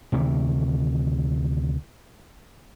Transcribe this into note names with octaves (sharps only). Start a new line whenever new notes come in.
D2 C3 D#3 E3